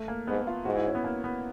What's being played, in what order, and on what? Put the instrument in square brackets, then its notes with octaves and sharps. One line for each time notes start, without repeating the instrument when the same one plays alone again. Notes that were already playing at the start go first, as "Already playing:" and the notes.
Already playing: [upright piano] A3
A#3
[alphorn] G#2 [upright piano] B3
[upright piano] F4
[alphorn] G#2 [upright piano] F#4
[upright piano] E4
C#4
B3
A#3
B3